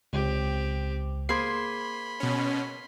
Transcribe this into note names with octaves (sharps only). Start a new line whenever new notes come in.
C#2 C4 G4
A#3 G#4 C5 B5 C6 G#6 C7
B2 C#4